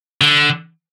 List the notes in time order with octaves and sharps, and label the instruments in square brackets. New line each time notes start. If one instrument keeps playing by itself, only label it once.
[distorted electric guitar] D3